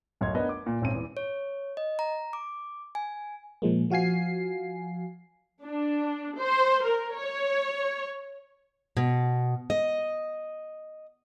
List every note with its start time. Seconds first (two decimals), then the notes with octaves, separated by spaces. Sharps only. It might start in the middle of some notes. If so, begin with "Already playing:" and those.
0.21 D1 F#2 C#5 D#5 C6 G#6
0.35 B3 D4 A#4 D#5
0.49 D6
0.66 A#2
0.81 D#1 G#1 C4 C#4 D#7
0.94 E2
1.17 C#5
1.77 D#5
1.99 A#5
2.33 D6
2.95 G#5
3.62 A#2 F3 G#3 A#3
3.90 F3 F#4 F5 G#5 C7
5.65 D4
6.39 C5
6.85 A#4
7.18 C#5
8.97 B2
9.70 D#5